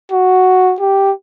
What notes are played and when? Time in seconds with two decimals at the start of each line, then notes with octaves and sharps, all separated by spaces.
0.12 F#4
0.80 G4